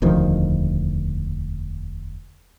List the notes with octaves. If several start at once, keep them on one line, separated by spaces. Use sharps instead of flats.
E1 D2 D#3 F3